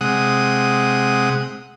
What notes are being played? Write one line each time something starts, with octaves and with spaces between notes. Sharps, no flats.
C3 G#3 F#5 D#6